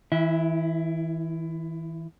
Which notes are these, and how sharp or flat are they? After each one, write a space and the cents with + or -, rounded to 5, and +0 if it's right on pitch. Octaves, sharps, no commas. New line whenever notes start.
E3 -30 E4 +20 E5 -25